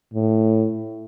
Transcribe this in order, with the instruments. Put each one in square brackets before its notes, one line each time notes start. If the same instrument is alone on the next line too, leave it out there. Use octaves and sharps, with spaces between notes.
[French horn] A2